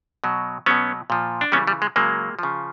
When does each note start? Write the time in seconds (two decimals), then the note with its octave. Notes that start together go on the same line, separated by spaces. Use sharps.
0.24 B2 F#3
0.66 B2 F#3 B3 C#4
1.10 A#2 F3
1.41 D4
1.52 C#3 E3 G3 B3 C#4
1.67 G3
1.82 G#3
1.96 C#3 F#3 G#3 A#3
2.39 C#3 F3